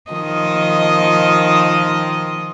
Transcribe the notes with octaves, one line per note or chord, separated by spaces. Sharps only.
D#3 F3 D#5